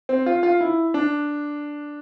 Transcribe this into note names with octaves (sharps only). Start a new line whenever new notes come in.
C4
F4
F4
E4
D4